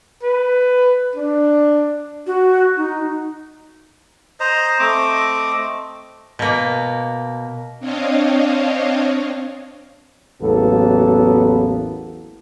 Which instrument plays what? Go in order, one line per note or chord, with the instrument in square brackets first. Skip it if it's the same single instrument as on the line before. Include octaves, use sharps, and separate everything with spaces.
[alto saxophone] B4
D4
[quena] F#4
D#4
[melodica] C5 D#5 A#5
A3 C4 D#5 D6
[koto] B2 A#3
[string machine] C4 D4 C#5 D#5 F5
[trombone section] A1 E2 F#3 A#3 B3 A4